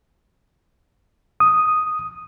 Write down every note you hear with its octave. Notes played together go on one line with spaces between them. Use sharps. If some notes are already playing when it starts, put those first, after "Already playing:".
D#6